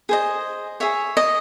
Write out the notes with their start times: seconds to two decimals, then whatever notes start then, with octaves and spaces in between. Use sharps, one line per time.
0.09 G#4 C5 D#5
0.80 G#4 C#5 E5
1.17 D#5